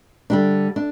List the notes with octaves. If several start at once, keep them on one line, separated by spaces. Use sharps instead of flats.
D3 G3 D4
D4